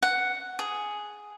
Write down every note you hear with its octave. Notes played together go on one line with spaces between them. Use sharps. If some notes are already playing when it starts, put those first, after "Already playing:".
F#5
G#4